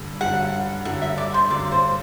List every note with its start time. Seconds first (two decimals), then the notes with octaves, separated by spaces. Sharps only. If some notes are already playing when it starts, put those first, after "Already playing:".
Already playing: G2 D3
0.21 G2 D3 F#3 F#5
0.85 G2 D3 F#3 F#5
1.02 E5
1.18 D5
1.34 C5
1.50 G2 D3 F#3 D5
1.72 C5